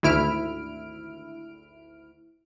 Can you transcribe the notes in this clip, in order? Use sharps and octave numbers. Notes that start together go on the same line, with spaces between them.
G#1 D2 E4 F6 D7